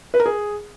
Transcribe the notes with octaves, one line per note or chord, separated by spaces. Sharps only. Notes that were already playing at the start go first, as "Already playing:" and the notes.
B4
A#4
G#4